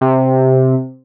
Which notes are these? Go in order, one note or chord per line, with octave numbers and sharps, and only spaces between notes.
C3